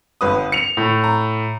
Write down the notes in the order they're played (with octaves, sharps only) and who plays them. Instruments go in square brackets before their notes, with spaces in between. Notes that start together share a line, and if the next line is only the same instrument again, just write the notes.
[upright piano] G1 B4 D#6
C#7 F7
[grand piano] A2
[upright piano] A#5